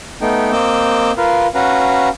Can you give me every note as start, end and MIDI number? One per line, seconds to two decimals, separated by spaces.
0.22 0.52 57
0.22 0.52 59
0.22 0.52 63
0.22 0.52 79
0.52 1.12 58
0.52 1.12 60
0.52 1.12 75
0.52 1.12 86
0.52 1.12 88
0.52 1.12 91
1.17 1.47 65
1.17 1.47 70
1.17 1.47 71
1.17 1.47 77
1.55 2.09 61
1.55 2.09 66
1.55 2.09 71
1.55 2.09 77
1.55 2.09 82